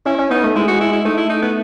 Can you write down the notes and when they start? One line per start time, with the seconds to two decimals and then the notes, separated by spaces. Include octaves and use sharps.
0.05 C#4 E4
0.18 C#4
0.30 B3 D#4
0.43 A3
0.55 G#3 E4
0.68 F#4
0.80 E4
0.92 E4
1.05 A3 D#4
1.17 E4
1.29 D#4
1.42 B3